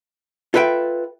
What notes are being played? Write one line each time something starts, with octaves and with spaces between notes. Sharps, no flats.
F4 A4 B4 E5 G5